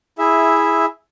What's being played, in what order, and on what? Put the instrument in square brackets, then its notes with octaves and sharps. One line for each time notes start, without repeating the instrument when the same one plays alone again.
[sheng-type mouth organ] E4 G#4 E5